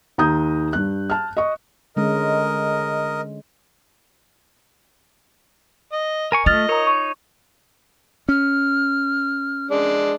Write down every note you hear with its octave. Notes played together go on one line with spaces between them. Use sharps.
D#2 A#5 D#6 G6
G2 F#6
A5 F6
D#5 C#6
D3 G#3 C#4 A#4 D#5
D#5
A#4 G#5 C#6
A3 F4 D#5 F6 A6 F7
D#4 A#4 C#5 A#5
C#6
C#4 F6
G#3 D4